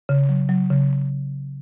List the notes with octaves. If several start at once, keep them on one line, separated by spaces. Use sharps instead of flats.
C#3
F#3
F#3
C#3